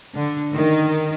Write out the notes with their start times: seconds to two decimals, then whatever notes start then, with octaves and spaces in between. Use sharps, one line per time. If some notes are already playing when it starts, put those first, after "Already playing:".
0.14 D3
0.54 D#3